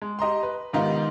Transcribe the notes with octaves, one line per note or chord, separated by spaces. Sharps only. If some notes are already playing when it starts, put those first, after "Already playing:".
G#3
G4 D#5 A#5 C6
B4
G#2 D#3 B3 D#4 F4 G4